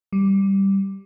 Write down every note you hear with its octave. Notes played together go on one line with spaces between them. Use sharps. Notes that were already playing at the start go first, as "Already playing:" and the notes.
G3